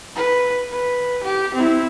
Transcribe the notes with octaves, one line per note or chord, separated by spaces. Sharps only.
B4
B4
G4
C4 E4